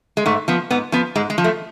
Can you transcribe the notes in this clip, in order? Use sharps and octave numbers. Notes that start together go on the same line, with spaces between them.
G#3
G#2 A3
F3 B3
G#2 B3
F3 B3
G#2 G#3
G#3
F3
A3